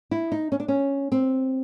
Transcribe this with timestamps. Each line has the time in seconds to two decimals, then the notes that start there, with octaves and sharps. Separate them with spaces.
0.11 E4
0.32 D#4
0.52 C#4
0.60 D4
0.68 C#4
1.12 C4